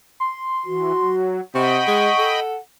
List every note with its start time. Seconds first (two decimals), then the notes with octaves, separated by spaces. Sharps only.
0.20 C6
0.66 E3 F#4
1.00 F#3
1.55 C3 D#5 F#5 G5 B5 C#6
1.88 G#3
2.18 A4